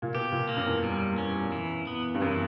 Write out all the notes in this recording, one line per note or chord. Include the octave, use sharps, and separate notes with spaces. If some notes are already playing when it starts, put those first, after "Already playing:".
A#2
B2 G4
A#2
A#3
F#2
E2
G3
C#4
E3
B3
G2
F#2 E3